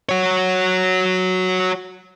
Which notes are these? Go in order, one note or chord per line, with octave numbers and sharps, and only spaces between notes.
F#4 C#5